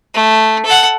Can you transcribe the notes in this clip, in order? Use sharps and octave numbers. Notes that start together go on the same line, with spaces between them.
A3
A4 F#5